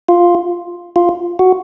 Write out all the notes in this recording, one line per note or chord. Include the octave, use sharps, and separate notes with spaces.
F4
F4
F#4